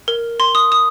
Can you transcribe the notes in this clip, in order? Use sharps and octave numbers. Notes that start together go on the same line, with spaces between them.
A#4
C6
D#6
D#6